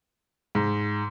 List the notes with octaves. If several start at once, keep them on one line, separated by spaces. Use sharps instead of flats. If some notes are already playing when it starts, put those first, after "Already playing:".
G#2